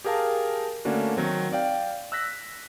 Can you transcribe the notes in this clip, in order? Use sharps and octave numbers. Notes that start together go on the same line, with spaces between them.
G4 G#4 A#4 F5 A5
D3 A3 A#3 C#4 D4 F#4
D#3 F#3 C4
D5 F5 G5
E6 F#6 A#6 B6